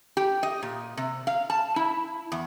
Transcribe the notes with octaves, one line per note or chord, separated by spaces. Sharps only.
G4
D#5
A#2
C3
F5
A5
E4
E2